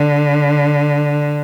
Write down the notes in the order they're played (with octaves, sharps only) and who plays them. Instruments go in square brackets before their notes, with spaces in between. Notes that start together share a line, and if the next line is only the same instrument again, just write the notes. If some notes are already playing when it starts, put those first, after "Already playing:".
Already playing: [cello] D3